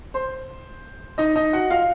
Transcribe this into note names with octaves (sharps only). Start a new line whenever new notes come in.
C5 C6
D#4 D#5
D#4 D#5
F#4 F#5
F4 F5